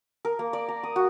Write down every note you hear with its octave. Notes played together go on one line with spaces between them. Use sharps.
A#4
A#3
D5
A#5
D#6
F#4